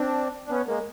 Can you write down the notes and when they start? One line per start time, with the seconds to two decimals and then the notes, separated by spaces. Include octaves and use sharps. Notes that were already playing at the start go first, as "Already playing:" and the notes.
Already playing: C4 D4
0.47 D4
0.50 B3 C#4
0.67 G#3 A#3